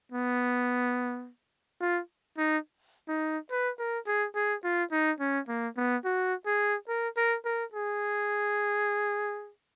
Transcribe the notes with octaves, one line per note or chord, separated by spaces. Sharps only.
B3
F4
D#4
D#4
B4
A#4
G#4
G#4
F4
D#4
C#4
A#3
B3
F#4
G#4
A#4
A#4
A#4
G#4